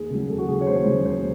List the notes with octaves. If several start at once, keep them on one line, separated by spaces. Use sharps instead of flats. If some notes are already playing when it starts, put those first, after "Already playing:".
Already playing: D#2 G#4
C#3 F#3
D#2 A4
F#4
C#3 F#3 G#4
C#5
D#2 C5
C#3 F#3
D#2 C5